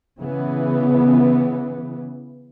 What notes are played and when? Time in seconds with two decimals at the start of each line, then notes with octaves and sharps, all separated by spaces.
0.20 C#3 E3 B3